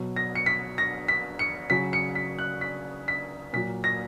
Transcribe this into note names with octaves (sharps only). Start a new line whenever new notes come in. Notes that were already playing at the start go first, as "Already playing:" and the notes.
Already playing: B2 F#3
A#6
C#7
B6
A#6
B6
C#7
C#3 F#3 B6
C#7
B6
F#6
B6
B6
A#2 F#3 B6
A#6